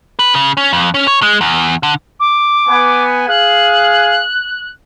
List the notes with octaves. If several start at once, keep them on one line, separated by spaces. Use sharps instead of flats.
B4
C#3
C#4
F2
C#4
C#5
G#3
E2
D3
D6
B3 G#5
G#4 F5 F#6